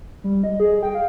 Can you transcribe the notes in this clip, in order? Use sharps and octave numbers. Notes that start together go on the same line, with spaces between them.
G3
D#5
G#4
G5
F5